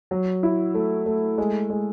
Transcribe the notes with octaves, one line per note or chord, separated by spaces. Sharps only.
F#3
E4
A3
A3
G#3
G#3